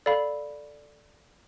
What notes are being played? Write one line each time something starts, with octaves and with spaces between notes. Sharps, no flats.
A4 D5 F5 B5